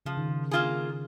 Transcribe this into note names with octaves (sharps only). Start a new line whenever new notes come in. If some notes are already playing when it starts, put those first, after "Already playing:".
C#3 F3
D#3
C#3
A#3 F4 G#4